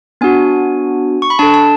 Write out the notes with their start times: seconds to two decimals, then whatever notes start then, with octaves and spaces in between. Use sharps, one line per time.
0.21 B3 D4 F#4 G#5
1.22 C#6
1.30 B5
1.39 D4 A4 A5
1.54 A5